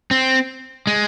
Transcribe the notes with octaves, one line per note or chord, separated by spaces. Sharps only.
C4
G#3